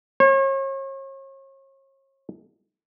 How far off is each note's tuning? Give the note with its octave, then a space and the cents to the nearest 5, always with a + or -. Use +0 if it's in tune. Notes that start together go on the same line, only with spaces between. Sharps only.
C#5 -40